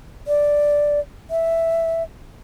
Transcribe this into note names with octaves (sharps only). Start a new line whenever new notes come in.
D5
E5